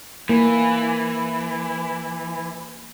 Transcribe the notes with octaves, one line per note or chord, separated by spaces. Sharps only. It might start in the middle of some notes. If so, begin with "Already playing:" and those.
E3 A#3